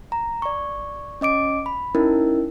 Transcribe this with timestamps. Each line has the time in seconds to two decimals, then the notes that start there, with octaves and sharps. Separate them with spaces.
0.12 A#5
0.42 D5 C#6
1.21 C#4 D#5 D6 D7
1.66 B5
1.95 C#4 D#4 E4 A#4